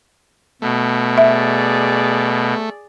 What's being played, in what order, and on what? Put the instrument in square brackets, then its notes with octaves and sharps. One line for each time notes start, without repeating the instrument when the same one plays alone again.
[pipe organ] B2 [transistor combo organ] A3
[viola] G#4 D5 [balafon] E5